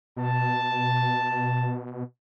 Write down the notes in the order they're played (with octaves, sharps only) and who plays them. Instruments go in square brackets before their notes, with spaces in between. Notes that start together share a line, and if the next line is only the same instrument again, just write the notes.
[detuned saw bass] B2 [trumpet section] A5